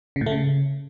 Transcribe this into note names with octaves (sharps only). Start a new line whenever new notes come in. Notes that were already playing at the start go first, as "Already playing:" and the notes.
C#3
A2
A3
C#3